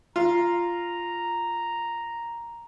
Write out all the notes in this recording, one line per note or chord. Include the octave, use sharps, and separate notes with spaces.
F4 A#5